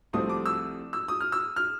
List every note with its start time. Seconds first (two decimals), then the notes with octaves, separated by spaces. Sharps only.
0.13 C2 C3 F3 A3 C4 D#6
0.29 D6
0.46 E6
0.93 E6
1.08 D#6
1.20 F6
1.32 E6
1.56 F6